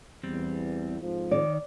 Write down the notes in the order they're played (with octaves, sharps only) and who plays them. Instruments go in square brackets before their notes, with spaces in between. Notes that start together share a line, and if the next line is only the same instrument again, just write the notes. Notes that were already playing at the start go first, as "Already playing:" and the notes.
[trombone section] E2 [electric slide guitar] G3 C4
[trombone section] F2 G#2 F3
[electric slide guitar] D#3 [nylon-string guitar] D5